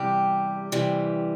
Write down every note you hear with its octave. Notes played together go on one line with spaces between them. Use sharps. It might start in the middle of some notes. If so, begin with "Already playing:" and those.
Already playing: E2 C3 G3 G4
C3 E3 G3